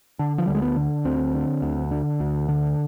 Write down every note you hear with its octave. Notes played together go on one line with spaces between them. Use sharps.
D3 D4
F3
D2 G3
G#3
B3
D3
D2 C4
D3
D2
D3
D2
D3